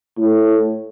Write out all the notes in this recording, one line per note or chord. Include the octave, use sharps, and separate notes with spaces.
A2